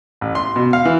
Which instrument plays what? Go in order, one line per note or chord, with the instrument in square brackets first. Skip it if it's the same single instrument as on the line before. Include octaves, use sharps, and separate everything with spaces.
[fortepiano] A1
C6
B2
F5
E3